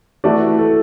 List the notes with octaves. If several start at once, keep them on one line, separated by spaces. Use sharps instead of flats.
E3 A3 E4 F#4 D5
A4